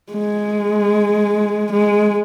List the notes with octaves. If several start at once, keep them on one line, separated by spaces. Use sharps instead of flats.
G#3
G#3